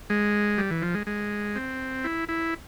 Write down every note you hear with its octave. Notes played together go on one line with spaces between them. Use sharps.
G#3
G3
E3
F3
G#3
G#3
C4
E4
E4